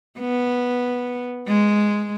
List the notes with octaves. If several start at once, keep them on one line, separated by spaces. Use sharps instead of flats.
B3
G#3